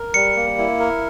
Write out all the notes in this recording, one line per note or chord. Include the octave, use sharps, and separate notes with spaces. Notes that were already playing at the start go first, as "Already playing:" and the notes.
Already playing: A#4
G3 C#7
A#3
E4
A#4